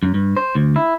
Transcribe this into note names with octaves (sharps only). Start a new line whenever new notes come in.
F#2
G2
C5
D2
E4